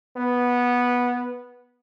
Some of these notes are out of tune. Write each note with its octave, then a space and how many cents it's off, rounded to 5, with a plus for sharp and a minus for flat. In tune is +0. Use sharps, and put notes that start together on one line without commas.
B3 -10